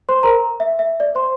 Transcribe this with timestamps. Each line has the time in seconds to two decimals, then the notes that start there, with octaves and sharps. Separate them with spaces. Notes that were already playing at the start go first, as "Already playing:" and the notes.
0.09 C5 C6
0.23 A#4 A#5
0.60 E5
0.79 E5
1.00 D5
1.15 C5 C6